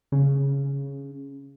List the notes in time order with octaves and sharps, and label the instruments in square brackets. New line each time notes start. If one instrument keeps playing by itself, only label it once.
[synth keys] C#3